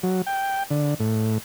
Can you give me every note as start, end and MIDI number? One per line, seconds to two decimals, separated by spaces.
0.03 0.22 54
0.27 0.63 79
0.70 0.94 50
1.00 1.38 45